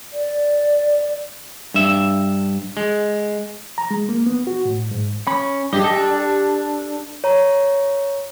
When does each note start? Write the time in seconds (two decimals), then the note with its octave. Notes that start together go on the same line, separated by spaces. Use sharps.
0.13 D5
1.74 G2 E5
2.77 G#3
3.78 A#5
3.91 G#3
4.09 A#3
4.26 B3
4.47 F#4
4.65 A2
4.91 G#2
5.27 C#4 B5
5.73 G2 D4 G4 G#4 D#5
5.84 G3 A4
5.97 D4
7.24 C#5 A#5